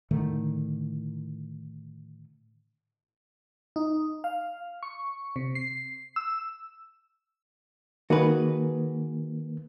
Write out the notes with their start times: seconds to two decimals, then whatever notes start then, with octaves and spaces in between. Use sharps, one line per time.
0.11 A2 D3 D#3 A3
3.76 D#4
4.24 F5
4.83 C#6
5.36 C3
5.55 C7
6.16 E6
8.10 D#3 A#3 F#4 G#4 B4